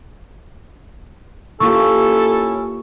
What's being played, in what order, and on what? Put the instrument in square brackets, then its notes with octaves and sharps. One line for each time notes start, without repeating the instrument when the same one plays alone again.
[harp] A#3 F4 G4 [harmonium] C#4 E4 [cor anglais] A4 [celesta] C#6